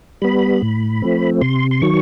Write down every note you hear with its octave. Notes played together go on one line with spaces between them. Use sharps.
G3 B3 B5
A2
F3 A3 C4
C3 C6
C6
D#3 F#3 C#6